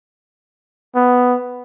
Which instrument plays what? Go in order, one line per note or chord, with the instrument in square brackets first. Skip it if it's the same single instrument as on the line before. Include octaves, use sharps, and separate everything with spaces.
[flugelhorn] B3